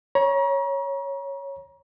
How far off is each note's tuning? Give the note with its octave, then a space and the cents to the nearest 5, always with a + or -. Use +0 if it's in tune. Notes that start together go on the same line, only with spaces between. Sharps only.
C#5 +0 A#5 +40